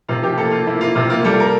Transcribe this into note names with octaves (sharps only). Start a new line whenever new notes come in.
C3 F4
F3 G4
A#3 A4
A#3 F4
A#3 E4
A#3 F4
C3 F4
A#3 F4
G3 A4
A#4